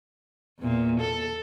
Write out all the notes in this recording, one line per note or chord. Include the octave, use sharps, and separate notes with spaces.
E2 A#2
A4